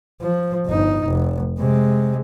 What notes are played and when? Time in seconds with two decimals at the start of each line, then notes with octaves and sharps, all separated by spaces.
0.22 F3
0.66 G1 D#4
1.05 F1
1.59 C3 G#3